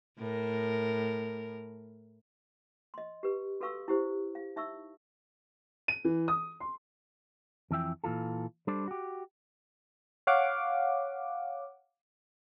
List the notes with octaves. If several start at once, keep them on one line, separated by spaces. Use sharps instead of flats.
A2 A#4
D#5 C6
G4 B4
F#4 A4 B4 F5 C#6 E6
E4 G4 C5
F5
D#4 E5 C#6 E6
D#7
E3
D#6
C6
F2 E3 E5 G5
A#2 E3 F4 A4
G3 D4 A4 C5 D5
F#4 G4
C#5 F5 F#5 D6